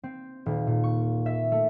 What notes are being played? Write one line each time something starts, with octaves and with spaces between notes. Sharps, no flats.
C4
D#1
A#2
C#6
E5
A3